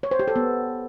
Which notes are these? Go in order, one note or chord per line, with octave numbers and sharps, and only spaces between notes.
C#5
C5
G4
A4
B3